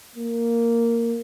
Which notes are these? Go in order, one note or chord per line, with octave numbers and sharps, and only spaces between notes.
A#3